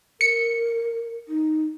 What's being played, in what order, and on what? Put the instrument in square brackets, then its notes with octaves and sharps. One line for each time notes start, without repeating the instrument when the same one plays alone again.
[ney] A#4 [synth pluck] C#7
[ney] D#4